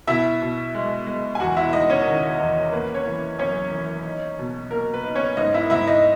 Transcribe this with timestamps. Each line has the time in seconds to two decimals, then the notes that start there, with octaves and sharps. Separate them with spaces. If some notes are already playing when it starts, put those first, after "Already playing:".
0.07 B2 E4 E5
0.41 B2
0.75 G#3
1.07 G#3
1.35 G#5
1.40 E2 F#4 F#5
1.57 E4 E5
1.73 G#3 D#4 D#5
1.90 C#4 C#5
2.06 D#3
2.39 E2
2.72 A#3 B4
2.94 C#4 C#5
3.05 E3
3.38 F#2 C#4 C#5
3.71 E3
4.05 D#4
4.39 B2
4.71 A#3 A#4
4.94 B4
5.04 D#4
5.15 C#4 C#5
5.37 G#2 D#4 D#5
5.54 E4 E5
5.70 G#2 E4 E5
5.87 D#4 D#5